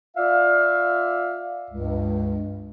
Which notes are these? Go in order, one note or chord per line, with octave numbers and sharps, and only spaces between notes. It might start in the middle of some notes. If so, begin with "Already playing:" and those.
F4 D5 E5 F5
C#2 G2